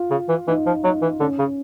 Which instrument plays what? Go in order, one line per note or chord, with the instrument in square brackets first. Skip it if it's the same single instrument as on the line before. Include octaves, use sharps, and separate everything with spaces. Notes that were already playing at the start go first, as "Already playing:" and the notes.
Already playing: [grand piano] F4
[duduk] C#3
E3
[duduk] E3 [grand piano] D#4
[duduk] F3
[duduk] F#3 [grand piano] D#4
[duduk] E3
[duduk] D3 [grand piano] C#4
[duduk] C#3